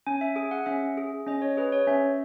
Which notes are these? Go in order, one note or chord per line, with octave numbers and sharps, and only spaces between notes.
C#4 G#5
E5
G#4 G#5
F#5
C#4 E5
G#4
C#4 D#5
C#5
G#4 B4
C#5
C#4 E5